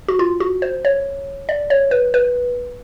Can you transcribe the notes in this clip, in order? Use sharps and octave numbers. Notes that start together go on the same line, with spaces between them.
F#4
F4
F#4
C5
C#5
D5
C#5
B4
B4